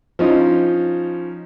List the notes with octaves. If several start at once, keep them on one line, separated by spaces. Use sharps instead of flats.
F3 C#4 D#4 F4